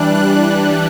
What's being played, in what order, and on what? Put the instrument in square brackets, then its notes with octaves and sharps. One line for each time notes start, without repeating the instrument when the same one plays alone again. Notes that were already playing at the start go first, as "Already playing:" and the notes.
Already playing: [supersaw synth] E3 G3 D4 F#6
F#6